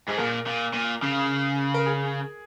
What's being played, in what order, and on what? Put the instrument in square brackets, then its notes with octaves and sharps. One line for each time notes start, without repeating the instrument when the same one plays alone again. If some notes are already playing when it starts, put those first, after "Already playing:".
[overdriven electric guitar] G#2 [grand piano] G#4
[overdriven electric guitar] A#2 [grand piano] A#4
[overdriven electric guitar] A#2
A#2
C#3
[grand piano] A#4
G#4